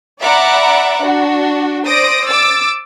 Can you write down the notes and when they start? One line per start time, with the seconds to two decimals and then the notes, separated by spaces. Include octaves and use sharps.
0.21 D5 E5 F#5 A#5 B5 D6
1.02 D4 F#4
1.86 C5 D5 D#6 A#6 D7
2.29 D6 E6 A6